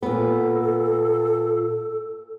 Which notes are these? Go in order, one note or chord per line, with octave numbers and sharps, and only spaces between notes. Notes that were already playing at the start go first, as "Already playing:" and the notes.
A#2 B3 A4